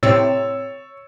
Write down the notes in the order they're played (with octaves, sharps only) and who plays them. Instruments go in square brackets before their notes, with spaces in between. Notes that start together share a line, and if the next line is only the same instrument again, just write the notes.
[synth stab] A2 C3 C4 [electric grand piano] C#5 E6 A6